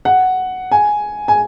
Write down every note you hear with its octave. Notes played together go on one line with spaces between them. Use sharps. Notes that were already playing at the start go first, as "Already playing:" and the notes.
F#5
G#5
G#5